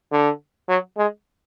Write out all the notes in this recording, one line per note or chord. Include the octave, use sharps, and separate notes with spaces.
D3
F#3
G#3